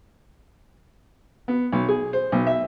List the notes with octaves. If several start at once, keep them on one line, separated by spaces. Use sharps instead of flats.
B3
B1
G#4
C5
B1
E5